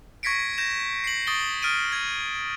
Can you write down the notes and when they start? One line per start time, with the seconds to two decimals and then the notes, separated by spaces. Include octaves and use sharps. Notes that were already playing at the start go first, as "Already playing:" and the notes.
0.23 C#6 G#6 A#6 B6 C#7 D7
0.58 G6 G#6 A#6 E7
1.04 C7 F#7
1.27 C#6 D#6 A6 D7 G7
1.62 D#6 F6 A6 D7 D#7
1.92 G#6